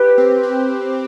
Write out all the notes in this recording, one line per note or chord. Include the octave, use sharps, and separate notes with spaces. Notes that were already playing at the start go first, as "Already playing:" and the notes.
Already playing: G4 B4
C4
C4